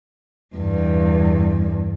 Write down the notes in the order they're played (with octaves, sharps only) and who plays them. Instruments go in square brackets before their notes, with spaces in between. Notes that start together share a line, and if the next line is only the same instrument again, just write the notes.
[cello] E2 G2